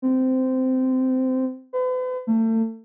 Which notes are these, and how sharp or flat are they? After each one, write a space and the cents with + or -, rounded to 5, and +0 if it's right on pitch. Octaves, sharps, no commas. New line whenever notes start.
C4 -15
B4 +45
A3 +35